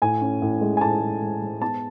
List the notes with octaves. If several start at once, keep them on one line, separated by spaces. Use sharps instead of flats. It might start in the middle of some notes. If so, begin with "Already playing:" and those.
A2 G#5
C#4
A2
G#3
G#5
A2 A5
G#3
G#3
G#3
B3 A5